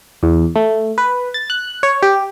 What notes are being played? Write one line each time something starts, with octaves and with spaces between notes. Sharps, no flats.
E2
A3
B4
A6
F#6
C#5
G4